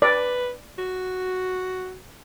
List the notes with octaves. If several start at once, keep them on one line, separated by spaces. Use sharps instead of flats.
B4 D5
F#4